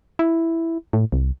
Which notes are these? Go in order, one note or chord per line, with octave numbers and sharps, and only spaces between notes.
E4
A2
C2